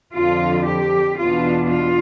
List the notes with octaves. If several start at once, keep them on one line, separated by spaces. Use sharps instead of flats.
F2 D3 F3 F4
G4
E2 B2 B3 D4 F4
F4